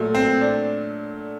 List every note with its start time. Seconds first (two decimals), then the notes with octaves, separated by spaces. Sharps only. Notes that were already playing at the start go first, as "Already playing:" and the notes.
Already playing: A#2 F#3 A3
0.15 C4
0.41 D4